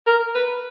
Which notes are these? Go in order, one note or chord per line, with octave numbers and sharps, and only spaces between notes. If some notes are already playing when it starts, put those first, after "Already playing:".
A#4
B4